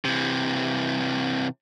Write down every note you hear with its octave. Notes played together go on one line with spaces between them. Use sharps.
C3 E3